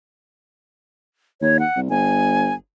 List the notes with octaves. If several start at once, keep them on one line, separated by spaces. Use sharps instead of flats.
D#2 C#5
F#5
C2
G1 G#5